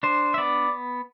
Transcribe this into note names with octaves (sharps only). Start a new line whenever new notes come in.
D4 C5
E5
B3 D5